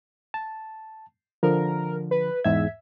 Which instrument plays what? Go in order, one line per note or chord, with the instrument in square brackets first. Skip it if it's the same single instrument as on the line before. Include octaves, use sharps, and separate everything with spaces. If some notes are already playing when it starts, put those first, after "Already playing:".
[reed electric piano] A5
[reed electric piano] D3 F3 [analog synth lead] A#4
[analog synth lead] B4
[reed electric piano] E2 G#2 G#6 [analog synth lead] E5